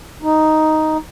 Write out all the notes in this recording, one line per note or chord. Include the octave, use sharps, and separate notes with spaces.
D#4